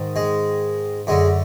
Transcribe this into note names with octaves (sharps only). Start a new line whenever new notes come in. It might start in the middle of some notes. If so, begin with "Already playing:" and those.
Already playing: G#2 D#3
G#3
F#2 D3 G#3